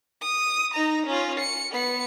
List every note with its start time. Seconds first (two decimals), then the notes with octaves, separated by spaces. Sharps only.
0.21 D#6
0.74 D#4 A#5
1.06 C#4 F4
1.39 C#7
1.70 B3 C#7